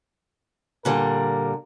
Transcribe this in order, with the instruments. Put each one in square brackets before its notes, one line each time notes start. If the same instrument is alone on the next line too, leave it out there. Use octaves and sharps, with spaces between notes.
[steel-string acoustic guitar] A#2 D3 G3 [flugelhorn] A#4